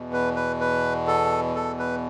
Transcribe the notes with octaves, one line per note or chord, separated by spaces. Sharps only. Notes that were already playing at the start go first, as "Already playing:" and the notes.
Already playing: E2 B2
B4
B4
B4
A4
A4
B4